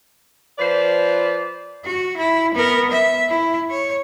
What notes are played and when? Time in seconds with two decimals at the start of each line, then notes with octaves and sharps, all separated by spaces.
0.59 F3 B4 C5 D5
1.84 F#4
2.17 E4
2.54 B3 A#4
2.91 E5
3.28 E4
3.70 C#5